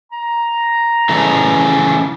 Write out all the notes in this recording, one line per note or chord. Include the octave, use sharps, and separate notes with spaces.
A#5
C#3 E3 A3